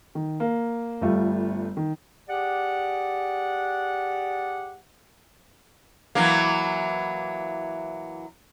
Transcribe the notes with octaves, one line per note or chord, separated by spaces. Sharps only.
D#3
A#3
G1 G3 A3 F4
D#3
G4 G#4 D5 F#5
E3 F#3 A#3